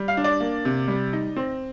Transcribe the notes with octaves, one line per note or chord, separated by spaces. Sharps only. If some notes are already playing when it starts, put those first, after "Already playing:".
Already playing: G3
F5
D4
D5
A#3
C3
G3
D#4
C4